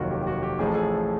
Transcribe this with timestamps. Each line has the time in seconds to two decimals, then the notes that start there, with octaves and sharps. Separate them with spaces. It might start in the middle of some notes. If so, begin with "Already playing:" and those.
Already playing: F1 D#2 D#3 F#3 F4 F#4
0.11 G4
0.22 G4
0.27 F#4
0.43 G4
0.59 A1 A2 F3 G#4
0.67 A4
0.75 G#4